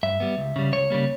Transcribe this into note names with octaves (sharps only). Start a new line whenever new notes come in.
G2 E5
G3 B3
C#2
C#3 G3
C#2 C#5
C#3 G3 A#3